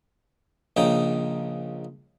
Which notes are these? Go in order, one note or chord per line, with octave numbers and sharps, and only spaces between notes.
A#1 C#3 D#4 G5